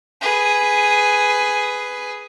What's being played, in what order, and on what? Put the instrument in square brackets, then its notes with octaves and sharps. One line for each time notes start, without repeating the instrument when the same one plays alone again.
[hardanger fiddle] G#4 B4